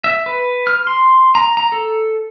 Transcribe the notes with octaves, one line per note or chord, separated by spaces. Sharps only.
E5
B4
F6
C6
A#5
A#5
A4